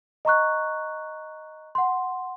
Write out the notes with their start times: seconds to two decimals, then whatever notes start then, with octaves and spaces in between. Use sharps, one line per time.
0.25 D#5 A#5 C#6 F#6
1.75 F#5 C6